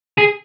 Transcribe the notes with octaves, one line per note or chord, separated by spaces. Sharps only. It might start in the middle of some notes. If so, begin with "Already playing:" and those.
G#4